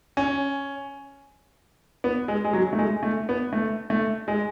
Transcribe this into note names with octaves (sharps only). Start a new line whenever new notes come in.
C#4
B3
G#3
G#3
F#3
A3
G#3
A3
B3
A3
A3
G#3